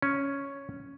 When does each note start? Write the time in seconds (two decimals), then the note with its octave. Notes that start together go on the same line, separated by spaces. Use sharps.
0.02 C#4